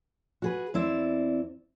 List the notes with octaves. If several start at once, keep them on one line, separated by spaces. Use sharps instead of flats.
F#4 G#4 B4
E2 C4 E4 D5